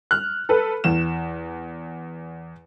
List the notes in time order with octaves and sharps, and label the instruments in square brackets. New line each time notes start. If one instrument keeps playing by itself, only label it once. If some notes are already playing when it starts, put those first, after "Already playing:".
[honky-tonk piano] F6 F#6
A4 B4
E2 E7